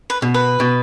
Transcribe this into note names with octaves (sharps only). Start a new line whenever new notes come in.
B4
B2
B4
B2